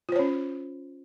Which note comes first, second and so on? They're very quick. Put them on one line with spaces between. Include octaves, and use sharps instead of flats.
F4 C5 C#5 C#4